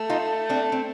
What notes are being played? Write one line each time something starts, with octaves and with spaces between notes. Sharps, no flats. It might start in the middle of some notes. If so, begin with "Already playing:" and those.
Already playing: A3
D#4 F4
C4 D4
C4